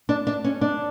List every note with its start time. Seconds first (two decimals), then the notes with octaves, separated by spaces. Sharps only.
0.09 D4
0.27 D4
0.44 C#4
0.61 D4